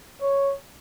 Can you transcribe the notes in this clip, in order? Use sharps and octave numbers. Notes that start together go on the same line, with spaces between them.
C#5